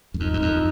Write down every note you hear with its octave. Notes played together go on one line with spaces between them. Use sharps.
F#2
F2 D#4
F#2
F2